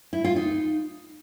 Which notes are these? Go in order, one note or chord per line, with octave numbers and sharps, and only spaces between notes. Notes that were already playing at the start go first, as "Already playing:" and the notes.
E4
F4
D#4